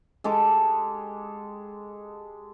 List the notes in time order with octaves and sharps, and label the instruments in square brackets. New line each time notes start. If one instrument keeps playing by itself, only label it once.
[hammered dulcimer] G#3 G4 A4 D6